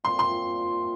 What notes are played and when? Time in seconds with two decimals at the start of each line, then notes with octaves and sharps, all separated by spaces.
0.04 A#2 G3 C4 F4 C6
0.19 C6